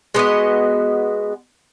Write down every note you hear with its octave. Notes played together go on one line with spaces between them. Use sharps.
G#3 B3 F#4 D#5